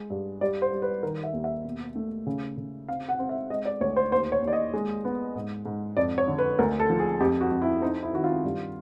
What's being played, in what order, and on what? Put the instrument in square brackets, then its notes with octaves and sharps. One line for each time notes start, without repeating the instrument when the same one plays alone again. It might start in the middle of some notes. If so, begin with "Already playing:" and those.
Already playing: [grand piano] G#3
G2
G3 D5
C5
G3
B4
D#3 A#4
E5
D#2
E5
B2
A3
C#3
C#3
C4 F5
F#5
C4
E5
G#3 D#5
D5
D2 C#5
C5
D#2 C5
C#5
D#2
D5
D#5
G#3
B3
G#2
G#2
F2 D5
C#5
D3
B4
D2 A#4
A4
F3
G#4
F2 G4
F#4
F2
E4
C4 D#4
E4
D#3 F#4
F4
G2